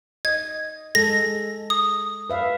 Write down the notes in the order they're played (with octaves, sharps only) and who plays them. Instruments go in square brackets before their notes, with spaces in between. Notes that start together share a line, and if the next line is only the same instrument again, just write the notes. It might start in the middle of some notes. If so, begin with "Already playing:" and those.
[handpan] D#5 [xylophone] G#6
[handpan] G#3 A4 [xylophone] A#6
[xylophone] D#6
[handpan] B4 E5 F5